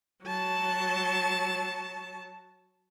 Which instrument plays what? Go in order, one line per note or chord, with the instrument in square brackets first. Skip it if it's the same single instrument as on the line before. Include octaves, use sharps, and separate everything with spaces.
[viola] F#3 A5